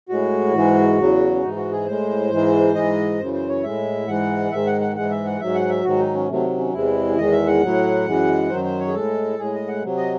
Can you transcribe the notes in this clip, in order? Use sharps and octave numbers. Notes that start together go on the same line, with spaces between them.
A2 G#3 F#4
G#2 E3 G#3
E2 C#3 F#3
C#4
G#2 E3 G#3 D#4
F#4
G#4
A2 G#3 C5
G#2 E3 G#3
G#2 E3 G#3 D#5
F#2 C#3 E3 C5
C5
C#5
A2 G#3 E5
G#2 E3 G#3 F#5
G#2 D#3 G#3 E5
F#5
F#5
G#2 E3 G#3 F#5
E5
F#5
G#2 F#3 E5
F#5
E5
G#2 D#3 F#3 F#4
D#4
C#4
C3 D#3 F#3 A3
C#4
E2 C3 E3 G#3 E4
E2 D#3 G#3 D#5
E5
F#5
A2 F#3
F#2 E3 G#3
F#2 D#3 F#3 C5
C5
C#5
G#4
A2 G#3 A4
A2 G#3 G#4
D#5
F#5
C3 F#3
D#5